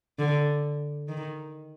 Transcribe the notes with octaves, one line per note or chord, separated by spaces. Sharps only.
D3
D#3